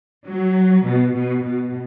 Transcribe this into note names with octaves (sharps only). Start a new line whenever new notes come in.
F#3
B2
B2
B2